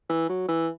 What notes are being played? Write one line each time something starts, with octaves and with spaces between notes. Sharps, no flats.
E3
F#3
E3